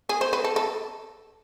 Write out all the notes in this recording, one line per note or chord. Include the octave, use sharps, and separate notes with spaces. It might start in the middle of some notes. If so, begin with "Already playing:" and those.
G#4
C5
B4
A4
A4